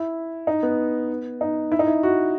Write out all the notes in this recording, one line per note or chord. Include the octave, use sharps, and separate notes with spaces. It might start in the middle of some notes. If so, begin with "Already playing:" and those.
Already playing: E4
D#4
B3
D#4
E4
D#4
E4
F#4